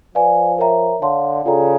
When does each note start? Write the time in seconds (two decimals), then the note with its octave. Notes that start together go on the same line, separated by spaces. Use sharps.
0.15 F3 B4 D5 F5 G#5
0.58 A#4 C#5 E5 G5 A#5
1.02 D3 C#5 F5 A5 C6
1.45 C#3 F4 A4 D5 G5 A#5